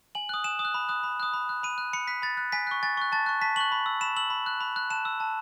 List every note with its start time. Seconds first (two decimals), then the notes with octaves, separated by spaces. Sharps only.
0.15 G#5 F#7
0.29 D#6 F#6
0.44 G#5 E7
0.59 D#6
0.65 F#6
0.74 B5
0.89 D#6 F#6
1.04 B5
1.20 D#6 F#6
1.34 B5
1.49 F#6
1.63 B5 D#7
1.78 F#6
1.93 B5 C#7
2.08 F#6 B6
2.22 B5 A6
2.37 F#6
2.52 G#5 B6
2.67 C#6 F#6
2.83 G#5 A6
2.97 C#6 F#6
3.12 A5 A6
3.26 C#6 F#6
3.42 A5 B6
3.56 C#6 F#6 F#7
3.72 B5
3.86 E6
4.01 B5 E7
4.17 E6 F#7
4.30 B5
4.46 F#6
4.61 B5
4.76 F#6
4.90 A5 E7
5.05 E6
5.20 A5